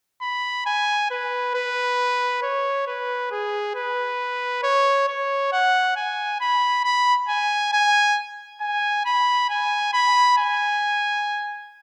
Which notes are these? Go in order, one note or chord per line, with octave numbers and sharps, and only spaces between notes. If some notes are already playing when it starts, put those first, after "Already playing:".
B5
G#5
B4
B4
C#5
B4
G#4
B4
C#5
C#5
F#5
G#5
B5
B5
G#5
G#5
G#5
B5
G#5
B5
G#5